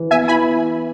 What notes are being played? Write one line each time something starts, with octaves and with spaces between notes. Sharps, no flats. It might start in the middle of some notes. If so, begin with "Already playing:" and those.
Already playing: E3
B3 E5 G#5
E4 G#5 B5